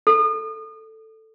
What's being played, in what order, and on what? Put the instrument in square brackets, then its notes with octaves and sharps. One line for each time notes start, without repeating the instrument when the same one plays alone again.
[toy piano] A4